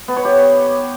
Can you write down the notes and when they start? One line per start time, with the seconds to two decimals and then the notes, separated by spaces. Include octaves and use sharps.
0.08 B3
0.16 C#5
0.25 G4